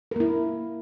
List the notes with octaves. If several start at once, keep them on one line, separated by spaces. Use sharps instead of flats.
A#3 E4 A#4